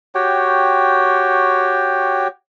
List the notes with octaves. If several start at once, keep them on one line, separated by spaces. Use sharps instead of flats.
F#4 G4 C#5 G5